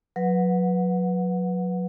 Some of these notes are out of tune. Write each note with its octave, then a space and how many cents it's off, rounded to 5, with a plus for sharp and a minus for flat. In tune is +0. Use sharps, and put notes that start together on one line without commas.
F#3 -30 B4 +0 F#5 -10